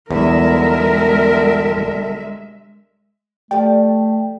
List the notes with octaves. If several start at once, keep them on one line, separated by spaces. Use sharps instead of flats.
B1 E2 D3 G3 G#3 A#4 E5
F3 A3 G4 A4 D5 G5